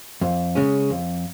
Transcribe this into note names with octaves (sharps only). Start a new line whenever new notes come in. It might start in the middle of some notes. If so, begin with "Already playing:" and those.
F2
C#3 G#3 C#4
F2